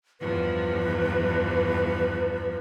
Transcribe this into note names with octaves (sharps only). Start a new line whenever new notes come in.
E2 G2 F3 B4